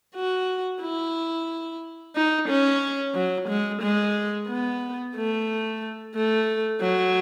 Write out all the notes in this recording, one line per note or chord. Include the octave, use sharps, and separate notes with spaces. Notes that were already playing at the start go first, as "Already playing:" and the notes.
F#4
E4
D#4
C#4
F#3
G#3
G#3
B3
A3
A3
F#3